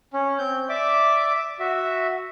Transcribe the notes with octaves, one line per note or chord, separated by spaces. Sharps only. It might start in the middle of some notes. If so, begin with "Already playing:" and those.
C#4
C4 G6
D5 E5 D6
F#4 E5